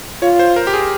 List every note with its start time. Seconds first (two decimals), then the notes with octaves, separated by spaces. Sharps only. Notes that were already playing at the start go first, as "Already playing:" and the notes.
0.22 F4 C#5
0.39 C5
0.56 A#4
0.67 G4
0.73 G#4